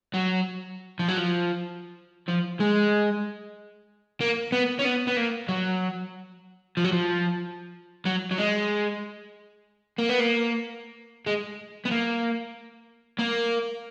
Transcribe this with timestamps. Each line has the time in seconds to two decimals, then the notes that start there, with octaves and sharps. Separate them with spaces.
0.14 F#3
0.99 F3
1.08 F#3
1.17 F3
2.28 F3
2.60 G#3
4.21 A#3
4.52 B3
4.79 C#4
4.85 B3
5.07 B3
5.17 A#3
5.49 F#3
6.77 F3
6.84 F#3
6.92 F3
8.05 F#3
8.31 F#3
8.38 G#3
9.98 A#3
10.09 B3
10.20 A#3
11.27 G#3
11.85 B3
11.91 A#3
13.19 A#3